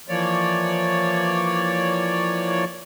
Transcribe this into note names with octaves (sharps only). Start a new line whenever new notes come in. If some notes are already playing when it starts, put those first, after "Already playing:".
E3 F3 A#3 C#5 D5